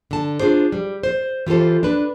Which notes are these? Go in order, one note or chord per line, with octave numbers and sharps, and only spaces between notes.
D3 A5
D4 F4 G#4 C5
G3
C5
E3 F4 G4 A4 C5
D4 B4